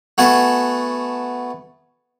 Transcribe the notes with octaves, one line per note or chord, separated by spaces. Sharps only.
A3 B3 F#4 G#5 A5